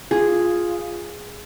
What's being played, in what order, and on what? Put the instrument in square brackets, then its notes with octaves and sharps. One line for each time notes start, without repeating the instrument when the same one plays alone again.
[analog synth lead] F4 [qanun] G#4